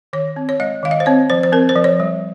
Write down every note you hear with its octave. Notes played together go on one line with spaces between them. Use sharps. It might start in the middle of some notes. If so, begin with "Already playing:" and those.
D#3 C#5
C4
C#5
G#3 D#5
D#3 F5
D#5
C5
C4 C#5
F3 C5
C5
C4 A#4
C5
F3
C#5
G3